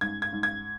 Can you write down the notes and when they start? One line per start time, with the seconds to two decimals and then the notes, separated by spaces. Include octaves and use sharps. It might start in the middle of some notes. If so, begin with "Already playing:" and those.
0.01 G#2 G#6
0.22 G#6
0.33 G#2
0.43 G#6